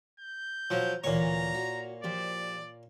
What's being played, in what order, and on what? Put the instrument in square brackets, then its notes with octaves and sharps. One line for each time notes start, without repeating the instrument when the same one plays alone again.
[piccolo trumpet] G6
[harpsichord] F3 F#3
[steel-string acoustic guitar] D2 E3 [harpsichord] A#2 C#5 [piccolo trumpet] A#5
[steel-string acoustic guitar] F#4
[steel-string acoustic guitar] F3 G4 C5 [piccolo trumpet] D5